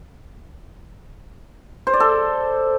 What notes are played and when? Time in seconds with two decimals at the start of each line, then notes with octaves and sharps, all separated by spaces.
1.87 C5
1.93 D5
2.00 A4